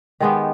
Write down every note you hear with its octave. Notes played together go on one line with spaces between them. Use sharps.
D#3 G#3 B3 G4